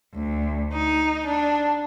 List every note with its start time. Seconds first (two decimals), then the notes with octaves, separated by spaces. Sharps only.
0.13 D2
0.72 D#4
1.25 D4